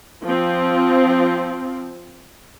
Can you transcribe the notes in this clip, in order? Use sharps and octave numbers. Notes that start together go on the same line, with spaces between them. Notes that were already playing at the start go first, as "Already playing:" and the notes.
F3 C4